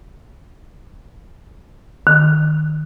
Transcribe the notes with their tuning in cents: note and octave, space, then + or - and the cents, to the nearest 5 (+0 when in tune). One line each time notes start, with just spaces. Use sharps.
D#3 -20